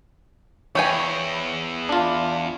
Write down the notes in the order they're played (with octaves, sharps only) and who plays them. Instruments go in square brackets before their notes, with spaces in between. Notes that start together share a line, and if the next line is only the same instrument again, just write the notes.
[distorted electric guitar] E2 [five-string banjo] C#5 G5 G#5
[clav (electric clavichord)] D4 F4